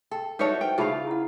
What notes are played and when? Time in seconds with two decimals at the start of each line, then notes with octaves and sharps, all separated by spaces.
0.11 A4 G5
0.39 D#4 E4 F#4 A4 B4 C#5
0.61 B4 C5 G5
0.78 C#3 A3 D#4 F4 G#4 F5 B5
1.07 E4 F#5